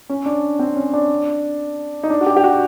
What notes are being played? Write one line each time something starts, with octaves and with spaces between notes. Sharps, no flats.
C#4
D4
C4
C#4
D4
D#4
D4
F#4
G4
G4
F#4